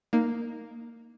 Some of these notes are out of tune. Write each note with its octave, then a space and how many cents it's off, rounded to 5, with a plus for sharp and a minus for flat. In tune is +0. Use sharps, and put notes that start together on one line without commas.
A#3 +0 D#4 +0